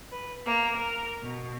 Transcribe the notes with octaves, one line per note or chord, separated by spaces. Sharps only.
B4
A#3
A#4
B2